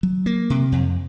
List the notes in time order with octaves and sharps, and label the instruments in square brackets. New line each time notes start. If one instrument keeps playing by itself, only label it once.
[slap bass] F#3
A#3
C3
F2